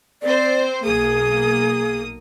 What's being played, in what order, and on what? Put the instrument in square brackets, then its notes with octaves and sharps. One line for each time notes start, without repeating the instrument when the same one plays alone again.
[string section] C4 C5 [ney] D5
[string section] B1 A#3 D#6 [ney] G#4